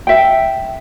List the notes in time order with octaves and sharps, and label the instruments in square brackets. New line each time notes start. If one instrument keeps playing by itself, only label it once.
[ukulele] E5 G5